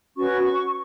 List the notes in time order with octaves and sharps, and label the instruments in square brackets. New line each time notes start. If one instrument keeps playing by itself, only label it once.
[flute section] C#4 F#4 B4 C#6